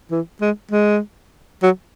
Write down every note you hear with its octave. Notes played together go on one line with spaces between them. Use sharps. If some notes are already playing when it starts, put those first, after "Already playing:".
E3
G#3
G#3
F#3